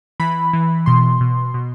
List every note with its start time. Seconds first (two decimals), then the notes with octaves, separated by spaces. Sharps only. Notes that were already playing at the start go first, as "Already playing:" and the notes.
0.20 E3 B5
0.53 E3
0.86 B2 C6
1.20 B2
1.54 B2